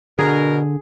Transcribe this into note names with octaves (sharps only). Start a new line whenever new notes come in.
B2 D3 G#4 A#4